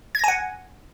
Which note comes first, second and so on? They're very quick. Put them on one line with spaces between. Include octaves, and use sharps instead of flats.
G#6 A#6 G#5 F#5